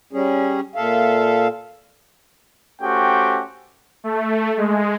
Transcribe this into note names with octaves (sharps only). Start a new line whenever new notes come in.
G3 C#4 G#4
A#2 A4 E5 F5
A3 C#4 F#4 G4 C5 G5
A3
G#3